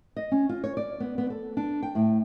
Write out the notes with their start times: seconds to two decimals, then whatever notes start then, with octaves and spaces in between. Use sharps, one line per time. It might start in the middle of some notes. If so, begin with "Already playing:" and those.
0.16 D#5
0.32 C#4
0.49 F4
0.64 C#5
0.77 D5
1.00 B3
1.18 B3
1.30 A4
1.57 D4
1.83 G5
1.95 A2